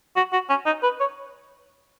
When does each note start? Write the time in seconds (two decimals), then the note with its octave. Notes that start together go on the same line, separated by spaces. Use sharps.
0.16 F#4
0.33 F#4
0.49 C#4
0.66 D#4
0.83 B4
1.00 C#5